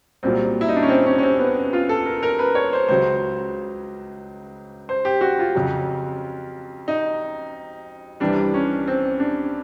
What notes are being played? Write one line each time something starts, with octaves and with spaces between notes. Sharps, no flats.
C2 A#2 F#3 C4
E4
D#4
D4
C#4
C4
C#4
C#4
C4
B3
F4
A4
A#4
A#4
B4
C#5
C5
C#2 C#3 F#3 C5
C5
G4
F#4
F4
F2 C#3 F#3
D#4
C2 C3 E3 G3 D4
C#4
C4
D4